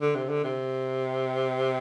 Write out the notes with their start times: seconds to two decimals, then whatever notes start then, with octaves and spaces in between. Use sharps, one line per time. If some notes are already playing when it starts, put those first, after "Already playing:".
0.01 D3
0.15 C3
0.29 D3
0.44 C3